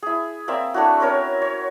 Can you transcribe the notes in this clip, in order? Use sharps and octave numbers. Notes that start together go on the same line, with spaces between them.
E4 G#4
A#3 C4 D5 E5
A3 D4 E4 F#4
C4 C#4 A#4 C#5
C#5